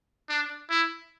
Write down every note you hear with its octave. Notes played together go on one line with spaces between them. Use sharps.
D4
E4